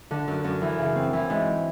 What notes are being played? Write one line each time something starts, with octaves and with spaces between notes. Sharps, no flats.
D3
F#2
F#2
E3
C#3
C4
E3
G#2